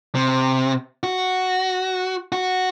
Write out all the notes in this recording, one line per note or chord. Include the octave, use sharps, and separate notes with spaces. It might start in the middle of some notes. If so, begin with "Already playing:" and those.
C3
F#4
F#4